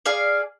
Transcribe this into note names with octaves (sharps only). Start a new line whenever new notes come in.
G#4 D5 F5